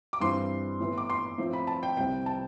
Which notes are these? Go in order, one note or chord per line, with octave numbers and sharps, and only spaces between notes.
D6
G2 E3 G3 C4 C6
A2 E3 B3
D6
C6
A2 F3 C4
B5
A5
G5
C2 C3 G3 C4 G5
A5